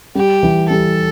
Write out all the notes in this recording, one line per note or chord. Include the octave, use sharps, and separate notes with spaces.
G3 G4
E3
G3 A4